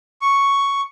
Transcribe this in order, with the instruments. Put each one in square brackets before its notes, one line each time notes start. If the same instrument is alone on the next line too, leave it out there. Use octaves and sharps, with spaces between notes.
[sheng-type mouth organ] C#6